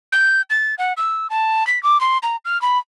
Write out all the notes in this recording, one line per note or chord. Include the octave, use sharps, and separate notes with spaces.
G6
A6
F#5
E6
A5
B6
D6
C6
A#5
F6
B5